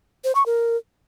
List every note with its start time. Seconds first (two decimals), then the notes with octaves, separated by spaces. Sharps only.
0.24 C5
0.35 C#6
0.46 A#4